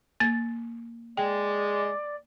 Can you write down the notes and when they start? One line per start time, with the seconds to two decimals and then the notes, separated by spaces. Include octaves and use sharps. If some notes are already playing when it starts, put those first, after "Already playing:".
0.20 A#3 A6
1.17 G#3 D5 G5